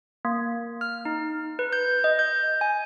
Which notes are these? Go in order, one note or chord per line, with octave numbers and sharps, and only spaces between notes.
A#3
F6
D#4
B4
G6
D#5
G6
G#5